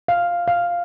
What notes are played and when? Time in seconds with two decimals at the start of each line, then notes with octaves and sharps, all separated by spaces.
0.08 F5
0.48 F5